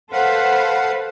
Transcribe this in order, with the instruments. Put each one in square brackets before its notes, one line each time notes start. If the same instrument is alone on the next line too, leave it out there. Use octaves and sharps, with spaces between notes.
[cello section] A4 B4 C5 [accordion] F5 F#5